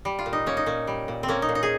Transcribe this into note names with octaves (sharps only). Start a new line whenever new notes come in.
G3
F4
A#2
D#4
A#3 C#4
D#4
A#2 C#4
G3
A#2
C4
A#3 C#4
D#4
A#2
D#4
G#4